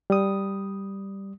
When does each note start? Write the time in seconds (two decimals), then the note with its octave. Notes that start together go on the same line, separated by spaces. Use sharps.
0.10 G3 D#6